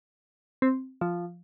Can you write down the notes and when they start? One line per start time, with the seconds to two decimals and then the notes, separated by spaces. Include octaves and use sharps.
0.62 C4
1.01 F3